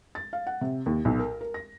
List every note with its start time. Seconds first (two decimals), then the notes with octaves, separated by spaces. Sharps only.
0.15 A6
0.33 F5
0.47 F#5
0.61 C3
0.86 D#2
1.05 B1
1.19 A#4
1.41 A#4
1.54 A#6